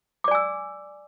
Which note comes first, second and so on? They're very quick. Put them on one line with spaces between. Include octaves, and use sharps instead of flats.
D6 D5 G#5 E6